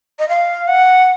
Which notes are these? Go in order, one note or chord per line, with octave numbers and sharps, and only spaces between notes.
D#5
F5
F#5